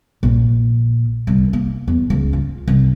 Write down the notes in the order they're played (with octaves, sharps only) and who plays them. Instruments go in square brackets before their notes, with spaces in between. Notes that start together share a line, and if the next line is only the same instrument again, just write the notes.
[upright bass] A#1
C2
A#3
E2
C#2
F4
C2